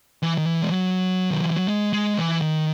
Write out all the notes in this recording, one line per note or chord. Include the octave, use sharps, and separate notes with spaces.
E3
D#3
E3
G#3
F#3
D#3
E3
F#3
G#3
G#3
E3
D#3